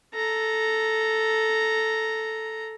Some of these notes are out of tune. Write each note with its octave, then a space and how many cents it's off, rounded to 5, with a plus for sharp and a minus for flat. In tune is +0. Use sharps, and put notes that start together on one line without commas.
A4 +0 A#5 +0